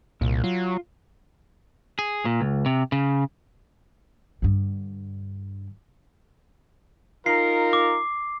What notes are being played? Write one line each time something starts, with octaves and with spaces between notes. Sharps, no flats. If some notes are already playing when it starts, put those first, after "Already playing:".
C2 A#2
F#3 F4
G#4
A#2
C#2
C3
C#3
G2 D3
D#4 F4 A#4 C7
D6